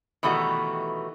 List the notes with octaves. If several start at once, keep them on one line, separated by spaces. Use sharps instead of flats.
B2 D#3 E3 G3 A3 F#4